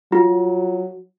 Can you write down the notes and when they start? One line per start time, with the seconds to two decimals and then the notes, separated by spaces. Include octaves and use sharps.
0.12 F#3 F4